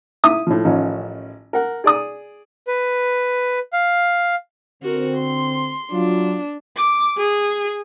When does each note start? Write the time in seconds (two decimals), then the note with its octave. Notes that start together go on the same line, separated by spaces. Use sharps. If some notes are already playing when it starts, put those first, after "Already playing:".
0.24 E4 E5 D#6
0.47 A2 F3
0.64 A1 D#3 F3 C#4 D#4
1.53 A#4 F#5
1.84 G#4 D5 D#6
2.68 B4
3.73 F5
4.83 D3 C4 F#4 A#4
5.18 C6
5.92 F#3 D4 F4
6.76 D6
7.17 G#4